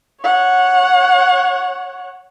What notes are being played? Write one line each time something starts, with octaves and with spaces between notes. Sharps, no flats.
C#5 F#5